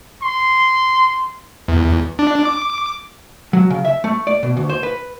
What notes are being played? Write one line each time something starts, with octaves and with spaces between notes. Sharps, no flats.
C6
E2
D4
D6
F#3
C#3
E5
A3
D5
B2
D2
C5
B4